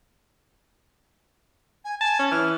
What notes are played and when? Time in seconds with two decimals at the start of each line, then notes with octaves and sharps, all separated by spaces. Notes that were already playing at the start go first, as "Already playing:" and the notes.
1.85 G#5
2.01 G#5 A5
2.19 C#4
2.31 E3 F6